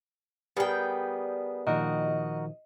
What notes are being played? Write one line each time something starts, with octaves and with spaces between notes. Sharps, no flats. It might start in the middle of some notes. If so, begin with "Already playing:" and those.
G3 B3 G#4 A#4 G5
A#2 D#3 F3 D#4 F#4 A#4 D#5